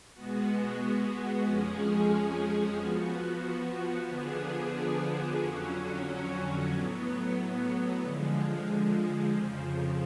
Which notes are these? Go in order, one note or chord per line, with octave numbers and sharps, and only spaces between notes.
B2 G#3 B3 F#4
F2 F3 G#3 C#4 G#4
F3 B3 F#4
D3 F3 B3 D4 G#4
F2 D3 F#3 C#4 F#4
A2 F#3 B3
D3 F3 G#3
F2 C#3 F3